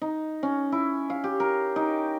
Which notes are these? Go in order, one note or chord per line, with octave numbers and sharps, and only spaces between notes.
D#4
C#4
E4
F5
G4
A#4
D#4